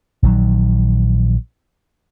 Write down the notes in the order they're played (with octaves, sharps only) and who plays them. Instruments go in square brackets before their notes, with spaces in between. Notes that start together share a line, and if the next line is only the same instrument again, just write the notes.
[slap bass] A#1 D#3 F#3